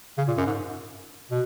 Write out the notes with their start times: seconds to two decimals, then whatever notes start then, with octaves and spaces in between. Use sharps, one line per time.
0.18 C#3
0.28 A#2
0.37 F#2
0.47 G#2
1.30 B2